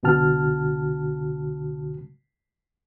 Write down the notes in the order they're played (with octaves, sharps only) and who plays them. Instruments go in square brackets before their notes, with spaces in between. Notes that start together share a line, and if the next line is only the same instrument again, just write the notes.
[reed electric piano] C2 B2 D3 F#4 A5 F6